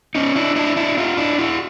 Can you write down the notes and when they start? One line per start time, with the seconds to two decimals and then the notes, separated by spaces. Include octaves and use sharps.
0.15 C#4 D#4
0.36 D4 E4
0.56 D4 E4
0.76 D4 E4
0.97 D#4 F4
1.17 D4 E4
1.39 E4 F#4